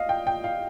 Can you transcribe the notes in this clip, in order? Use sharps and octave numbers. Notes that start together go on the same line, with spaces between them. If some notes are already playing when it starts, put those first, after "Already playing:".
Already playing: D#5 F5
G5
G5
F5